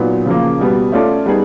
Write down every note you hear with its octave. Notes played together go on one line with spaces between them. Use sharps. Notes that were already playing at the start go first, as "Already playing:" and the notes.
Already playing: A#2 F#3 B3 D#4
C#3 F3 A#3
B2 G3 B3
A3 C#4 F4 A4 D5
G3 B3 D#4 G#4